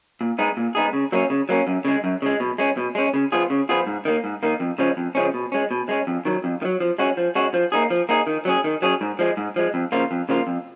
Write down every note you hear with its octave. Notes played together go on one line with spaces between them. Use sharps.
A#2
G#3 B3 D#4 G#4
A#2
G#3 B3 D#4 G#4
C#3
F#3 A#3 C#4
C#3
F#3 A#3 C#4
F#2
C#3 G#3
F#2
C#3 G#3
B2
G#3 C#4
B2
G#3 C#4
C#3
F3 B3 F4 G#4
C#3
F3 B3 F4 G#4
G#2
D#3 A#3
G#2
D#3 A#3
F2
C#3 F3 G#3 C#4
F2
C#3 F3 G#3 C#4
B2
G#3 C#4
B2
G#3 C#4
F2
D#3 F#3
F2
D#3
F#3
F3
G#3 C#4 F#4
F3
G#3 C#4 F#4
F3
A#3 D#4 G#4
F3
A#3 D#4 G#4
D#3
F#3 C#4 G#4
D#3
F#3 C#4 G#4
G#2
F3 G#3
G#2
F3 G#3
F2
C#3 F3 A#3 F4
F2
C#3 F3 A#3 F4
F2